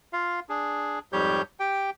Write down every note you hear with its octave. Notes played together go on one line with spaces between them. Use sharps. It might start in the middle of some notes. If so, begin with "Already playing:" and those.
F4 F5
D4 G#4
F2 G#2 G3 G4 C#5 G6
G4 G5